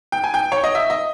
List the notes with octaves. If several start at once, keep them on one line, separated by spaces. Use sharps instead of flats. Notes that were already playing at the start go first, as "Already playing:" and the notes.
G5
G#5
G5
C#5
D#5
E5
D#5